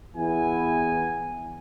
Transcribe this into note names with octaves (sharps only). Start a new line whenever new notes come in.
E2 E3 B3 E4 G#5